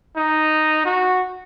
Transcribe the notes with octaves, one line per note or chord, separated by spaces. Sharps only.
D#4
F#4